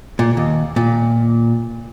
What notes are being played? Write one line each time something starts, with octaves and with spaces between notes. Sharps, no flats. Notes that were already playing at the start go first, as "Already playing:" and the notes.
A#2
D#2
A#2